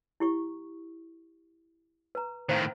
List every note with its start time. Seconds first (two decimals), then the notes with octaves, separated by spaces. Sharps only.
0.20 E4 G4 C#6
2.15 B4 A#5
2.49 A2 D#3 C5 F5 A#5